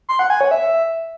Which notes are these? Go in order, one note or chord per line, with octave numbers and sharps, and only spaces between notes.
C6
F#5
G#5
C#5
E5